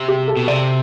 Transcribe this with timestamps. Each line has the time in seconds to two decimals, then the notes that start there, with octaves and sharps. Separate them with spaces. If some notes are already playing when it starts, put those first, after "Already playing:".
Already playing: C3
0.08 G4
0.28 A4
0.37 B2
0.48 C3 D5